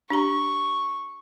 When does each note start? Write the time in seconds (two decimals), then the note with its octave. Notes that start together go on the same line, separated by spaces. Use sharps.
0.10 D4 G4 A#5 C#6